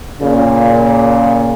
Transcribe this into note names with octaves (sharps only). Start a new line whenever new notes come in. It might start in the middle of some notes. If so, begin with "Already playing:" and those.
A#2 C#3